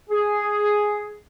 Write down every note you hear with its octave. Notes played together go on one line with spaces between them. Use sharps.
G#4